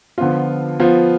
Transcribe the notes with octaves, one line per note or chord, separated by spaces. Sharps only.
D3 F3 B3 F4
F3 B3 F4